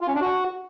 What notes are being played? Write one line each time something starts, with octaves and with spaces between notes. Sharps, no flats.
F4
C#4
D4
F#4